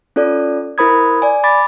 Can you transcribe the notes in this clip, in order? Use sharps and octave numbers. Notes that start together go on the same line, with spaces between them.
C#4 F4 A4 D5
E4 A#4 C5 B5 D#6 G#6
D5 G#5
B5 D6 A6